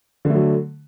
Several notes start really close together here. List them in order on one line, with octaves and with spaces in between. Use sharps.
D3 A3 F#3